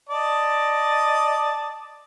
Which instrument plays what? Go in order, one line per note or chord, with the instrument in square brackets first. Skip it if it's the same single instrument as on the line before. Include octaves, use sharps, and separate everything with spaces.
[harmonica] D5 D#5 A5